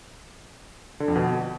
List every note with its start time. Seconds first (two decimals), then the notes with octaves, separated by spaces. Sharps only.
1.00 D3
1.08 F2
1.16 B2